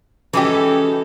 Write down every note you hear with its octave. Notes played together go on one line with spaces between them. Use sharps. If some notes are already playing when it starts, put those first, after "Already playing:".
E3 G#3 C#4 D#4 F#4 G4 A4